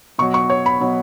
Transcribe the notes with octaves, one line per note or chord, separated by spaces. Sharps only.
B2 F#3 C#6
C#6
C#5
B5
B2 F#3